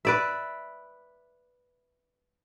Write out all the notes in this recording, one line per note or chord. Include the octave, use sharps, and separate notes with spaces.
B4 D5 E5